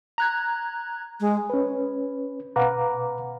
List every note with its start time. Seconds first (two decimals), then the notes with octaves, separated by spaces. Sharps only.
0.18 A#5 F#6 G#6
1.20 G#3
1.50 C#4 B4
2.56 B2 B4 F5 F#5 A#5 D6